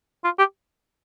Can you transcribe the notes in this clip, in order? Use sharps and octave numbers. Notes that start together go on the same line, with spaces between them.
F4
G4